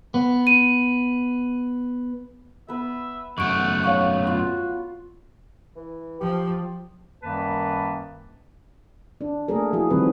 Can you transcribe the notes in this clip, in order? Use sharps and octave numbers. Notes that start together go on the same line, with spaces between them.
B3
D#7
B3 B4 E5
F#2 A3 F#5 C#6 D7
C#5 F5 C#6
B3 F4 F#4
E3
F3 G4
F#2 D#3 G3 A#3 B4 A5
D4
A3 A#3 D4 G#4 A#4
F3 E4 F#4 G#4
D#3 F3 G3 C4 B4